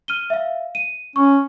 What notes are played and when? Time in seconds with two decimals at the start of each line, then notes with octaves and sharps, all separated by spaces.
0.08 F6 D#7 G7
0.30 E5 F5
0.75 D#7
1.16 C#4 C#6